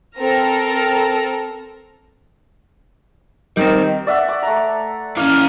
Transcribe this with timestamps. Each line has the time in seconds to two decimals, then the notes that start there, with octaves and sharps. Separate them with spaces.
0.18 C4 A4 A#4 F6 A#6
3.57 D#3 G3 C4
4.07 D5 E5 F#5
4.28 D6
4.43 A3 A#5
5.17 E3 A#3 C#4 F5